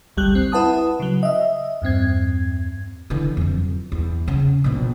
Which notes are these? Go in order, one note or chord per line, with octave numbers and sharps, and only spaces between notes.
G#1 D2 G3 G4 F#6
C4
E4 B4 F#5 A5 D#6
C#3 F#3
D#5 E5
E2 G2 C4 G#6
D3 E3
F2 F#3
E2
C#3
A#1 B2